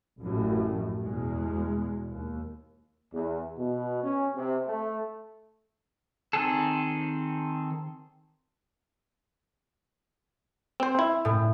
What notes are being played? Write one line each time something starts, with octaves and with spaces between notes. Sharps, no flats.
A1 F#2 A2
E2 B2 G#3
D#2
E2
B2
C#4
C3
A3
D#3 C4 G#4 A4
C4 C5
E4
A2